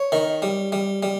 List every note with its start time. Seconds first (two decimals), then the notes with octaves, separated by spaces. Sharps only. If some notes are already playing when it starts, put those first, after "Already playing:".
Already playing: C#5
0.12 D#3
0.42 G3
0.72 G3
1.03 G3